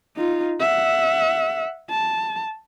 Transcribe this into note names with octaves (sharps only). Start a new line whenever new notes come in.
D#4 F4
E5 F#5
A5